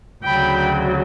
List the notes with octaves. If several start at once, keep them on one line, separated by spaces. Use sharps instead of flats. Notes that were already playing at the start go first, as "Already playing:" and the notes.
D2 C#3 F#3 G5 B5